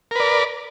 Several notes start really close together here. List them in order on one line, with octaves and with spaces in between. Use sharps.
A#4 B4 D5